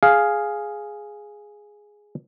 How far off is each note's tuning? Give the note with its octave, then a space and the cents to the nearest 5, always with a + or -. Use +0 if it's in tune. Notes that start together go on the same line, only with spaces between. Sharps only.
G#4 +0 F5 +0